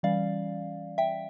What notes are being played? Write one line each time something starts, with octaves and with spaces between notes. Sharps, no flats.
E3 G3 C#4 D5 F5
E5 G5